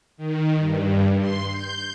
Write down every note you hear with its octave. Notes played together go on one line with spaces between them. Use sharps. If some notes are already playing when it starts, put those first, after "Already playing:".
D#3
G2
C6
G6